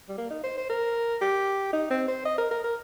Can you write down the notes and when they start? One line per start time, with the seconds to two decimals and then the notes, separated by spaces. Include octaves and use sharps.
0.09 G3
0.18 A#3
0.30 D#4
0.43 C5
0.57 C5
0.70 A#4
1.21 G4
1.73 D#4
1.90 C4
2.08 C5
2.25 D#5
2.38 A#4
2.51 A#4
2.64 A#4